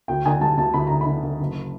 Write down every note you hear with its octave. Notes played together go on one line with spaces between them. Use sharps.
D2 G5
D3 G#5
G3 A5
D2 A5
D2 B5
D3 A#5
B5
D3
D3
F#1